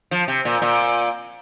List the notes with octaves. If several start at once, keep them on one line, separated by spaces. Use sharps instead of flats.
F3
C3
A#2
A#2